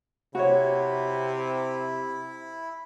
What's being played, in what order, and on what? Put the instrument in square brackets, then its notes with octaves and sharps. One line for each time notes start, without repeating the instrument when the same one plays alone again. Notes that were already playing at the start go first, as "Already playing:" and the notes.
[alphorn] C3 [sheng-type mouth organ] E4 [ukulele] F#4 C#5